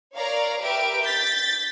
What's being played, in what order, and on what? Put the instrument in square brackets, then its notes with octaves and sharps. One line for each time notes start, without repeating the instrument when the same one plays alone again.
[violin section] A#4 C#5 D5 F5 A#5
G4 A#4 B4 E5 D7
G6 A6 B6